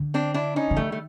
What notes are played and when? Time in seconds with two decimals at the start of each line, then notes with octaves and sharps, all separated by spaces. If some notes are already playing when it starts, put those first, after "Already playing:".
Already playing: D3
0.14 C4 D4
0.34 D4 E4
0.56 C#4 D#4
0.71 D3
0.76 D#3 G3 A3
0.92 A3